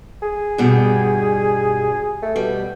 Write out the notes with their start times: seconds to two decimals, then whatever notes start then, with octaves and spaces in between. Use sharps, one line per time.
0.22 G#4
0.58 G2 B2 G3
2.22 A3
2.36 B2 G3